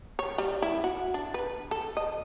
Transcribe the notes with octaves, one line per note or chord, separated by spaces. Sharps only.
C#5
G3
E4
F#4
D4
B4
A4
D#5